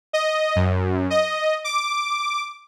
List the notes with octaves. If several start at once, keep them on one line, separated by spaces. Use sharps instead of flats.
D#5
F#2
D#5
D6